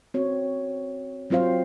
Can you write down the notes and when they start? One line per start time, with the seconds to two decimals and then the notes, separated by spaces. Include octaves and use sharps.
0.14 C4 F#4 C#5
1.30 F#3 C4 F4 C5 F5